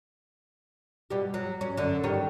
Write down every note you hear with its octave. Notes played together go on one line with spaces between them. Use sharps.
B2 G3 G4
F#3
C#4
F#2 D3
D#3 G3 C#5